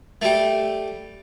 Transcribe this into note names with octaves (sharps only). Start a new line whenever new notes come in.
G3 A3